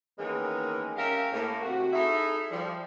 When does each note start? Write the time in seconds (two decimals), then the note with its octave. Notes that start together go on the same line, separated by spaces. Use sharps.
0.19 D#3 E3 G#3 A#3 B3 C#4
0.97 C#4 G4 A#4 E5 F5
1.32 A2 A#3
1.62 C3 F#4
1.93 D#4 E4 G#4 A4 E5
2.50 F3 G3